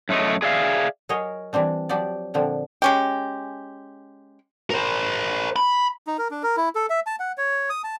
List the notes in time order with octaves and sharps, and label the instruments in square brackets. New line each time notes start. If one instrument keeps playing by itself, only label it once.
[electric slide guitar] F#2 A3 C#5 D#5
G#4 D5 E5 F5
[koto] F#3 G#4 A#4 C#5 D#5
E3 G3 C4 D4
F3 F#3 G4 D5
A#2 D3 F3 C4
[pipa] G#3 C#4 G4
[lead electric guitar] A#4 C5
B5
[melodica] D#4
A#4
D4
A#4
E4
A4
E5
A5
F#5
C#5
D#6
A5